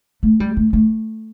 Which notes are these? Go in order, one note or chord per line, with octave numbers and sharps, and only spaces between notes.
A3
G3
A3
A3